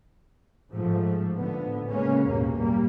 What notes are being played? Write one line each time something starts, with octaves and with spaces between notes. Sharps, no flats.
G#2 F3 A3
A2 D3 B3
C#3 G#3 A#3 C#4
A1 E2 G2 B2 A#3
G3 A#3